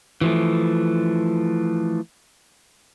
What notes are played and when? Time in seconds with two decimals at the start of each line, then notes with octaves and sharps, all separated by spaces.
0.21 E3 F3 A3